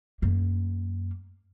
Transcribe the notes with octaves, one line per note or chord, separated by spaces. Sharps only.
F#2 A#3